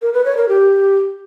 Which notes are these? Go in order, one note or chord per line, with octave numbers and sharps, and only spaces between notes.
A#4
B4
C#5
A#4
G4